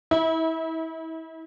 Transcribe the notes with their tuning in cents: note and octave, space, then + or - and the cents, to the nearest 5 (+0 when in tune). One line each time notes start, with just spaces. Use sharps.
E4 -30